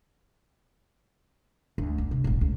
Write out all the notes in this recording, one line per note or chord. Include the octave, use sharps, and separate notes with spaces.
D2
A#3
C3
E1 A1
C#2